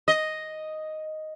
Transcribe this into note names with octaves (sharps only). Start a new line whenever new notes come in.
D#5